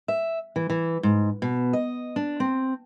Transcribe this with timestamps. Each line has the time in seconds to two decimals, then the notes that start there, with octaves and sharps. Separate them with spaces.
0.08 E5
0.56 E3
0.70 E3
1.03 G#2
1.42 B2
1.73 D#5
2.16 D4
2.40 C4